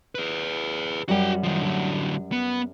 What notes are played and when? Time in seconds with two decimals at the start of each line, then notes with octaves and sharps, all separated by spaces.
0.15 G#4 B4
1.09 F#2 G3 F#4 F#5 G5
1.43 D#3 F3
1.63 D3 F#3
2.32 B3